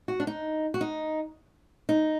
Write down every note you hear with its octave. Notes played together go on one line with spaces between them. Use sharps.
F#4
D4
D#4
F#4
D#4
D#4